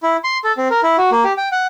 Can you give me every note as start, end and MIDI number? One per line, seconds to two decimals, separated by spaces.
0.03 0.16 64
0.24 0.38 84
0.44 0.52 69
0.58 0.68 60
0.71 0.81 70
0.83 0.97 64
0.98 1.10 66
1.12 1.24 58
1.24 1.33 67
1.38 1.49 79
1.52 1.67 78